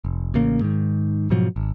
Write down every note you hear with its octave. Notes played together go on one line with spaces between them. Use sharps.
F1
A1 C#3 A#3
G#2 D#3
G#2 B2 F3 F#3
G#1